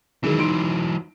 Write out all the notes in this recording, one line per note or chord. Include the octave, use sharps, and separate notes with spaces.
D#3 E3 F#3 G#3
D#4 C6 D7